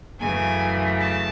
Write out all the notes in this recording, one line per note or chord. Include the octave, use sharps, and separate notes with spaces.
F#2 C#3 E3 A3 G#5
A5